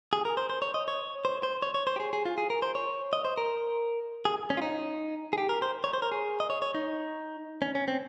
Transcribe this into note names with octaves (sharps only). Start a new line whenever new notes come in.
G#4
A#4
C5
C5
C#5
D#5
C#5
C5
C5
C#5
C#5
C5
G4
G#4
G#4
F4
G#4
A#4
C5
C#5
D#5
C5
A#4
G#4
C#4
F4
D#4
G#4
G4
A#4
C5
C#5
C5
A#4
G#4
D#5
C#5
C#5
D#4
C#4
C#4
C4